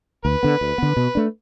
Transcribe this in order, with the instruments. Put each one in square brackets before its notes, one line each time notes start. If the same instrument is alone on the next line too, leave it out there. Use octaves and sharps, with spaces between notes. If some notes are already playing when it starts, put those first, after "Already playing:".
[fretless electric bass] D2 [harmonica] B4
[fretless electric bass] D3 B3
D2
D3 B3
B2
A3 D4